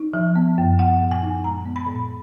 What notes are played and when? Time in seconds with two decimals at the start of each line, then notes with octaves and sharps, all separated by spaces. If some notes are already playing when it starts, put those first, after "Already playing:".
Already playing: D#4
0.14 F3
0.35 B3
0.58 F#2
0.79 B3 F#5
1.01 A#2
1.11 G#5
1.23 D#4
1.44 G#3 A#5
1.65 B3
1.76 B5
1.87 A#2